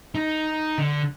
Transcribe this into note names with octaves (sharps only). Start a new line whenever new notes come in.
D#4
D3